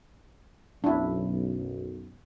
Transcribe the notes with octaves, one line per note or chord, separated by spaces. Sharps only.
B1 F#2 D4 E4